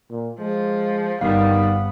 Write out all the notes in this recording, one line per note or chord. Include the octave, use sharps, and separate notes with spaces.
A#2
F3 G#3
G1 D#3 G3 B3 F5